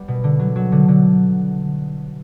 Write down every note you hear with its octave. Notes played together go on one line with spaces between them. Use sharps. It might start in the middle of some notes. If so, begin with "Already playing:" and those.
Already playing: G3 B3
B2
D3
F#3
F#3
D3
D3